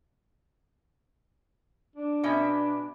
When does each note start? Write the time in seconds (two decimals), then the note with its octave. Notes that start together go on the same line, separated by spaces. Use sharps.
1.96 D4
2.23 B2 C#4 E5